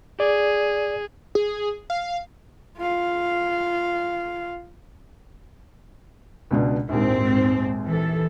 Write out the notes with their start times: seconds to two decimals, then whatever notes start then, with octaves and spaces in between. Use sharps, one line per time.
0.20 G#4 D5
1.35 G#4
1.90 F5
2.77 F4 F5
6.51 C#2 B2 D4
6.89 A#1 D#2 G#2 C4
7.86 E3 A4